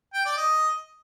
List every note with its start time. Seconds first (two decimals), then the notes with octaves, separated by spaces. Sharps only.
0.14 G5
0.26 D5
0.37 D#5